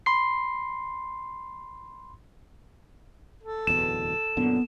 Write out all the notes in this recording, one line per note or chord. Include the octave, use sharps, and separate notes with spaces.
B5 C6 C7
A4
D1 E2 B2 E7
F#2 A#2 D3 B3